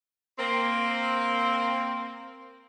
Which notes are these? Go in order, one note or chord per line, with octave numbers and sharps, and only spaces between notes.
A#3 C4